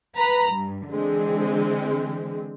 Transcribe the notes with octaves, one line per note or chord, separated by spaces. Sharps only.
B4 A#5 B5
G2
D3 E3 G#3 C4